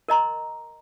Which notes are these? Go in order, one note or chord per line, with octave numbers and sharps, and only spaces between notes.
A#4 D#5 A#5 C6